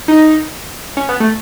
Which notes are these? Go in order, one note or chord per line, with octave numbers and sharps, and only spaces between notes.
D#4
C#4
B3
A3